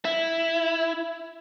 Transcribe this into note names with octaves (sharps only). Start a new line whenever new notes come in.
E4